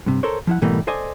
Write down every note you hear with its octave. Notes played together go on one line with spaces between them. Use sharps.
G2 C3
A4 A#4 C5 C#5
F3 E4 F#5
G#2 B2 E3 G3 A3 A#3
A4 C5 D5 D#5 G#5